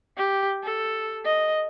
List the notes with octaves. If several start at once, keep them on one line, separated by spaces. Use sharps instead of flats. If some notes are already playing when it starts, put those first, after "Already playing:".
G4
A4
D#5